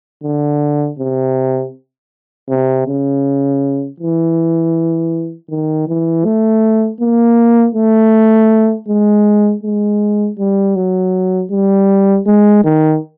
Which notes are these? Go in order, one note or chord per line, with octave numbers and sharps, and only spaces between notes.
D3
C3
C3
C#3
E3
D#3
E3
A3
A#3
A3
G#3
G#3
G3
F#3
G3
G#3
D#3